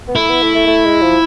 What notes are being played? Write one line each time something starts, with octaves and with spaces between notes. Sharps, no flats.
B3
A3 E4
B3
A3
A3
A3
G#3
F3